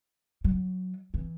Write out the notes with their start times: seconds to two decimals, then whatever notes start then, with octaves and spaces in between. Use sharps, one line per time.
0.44 F#3
1.14 E3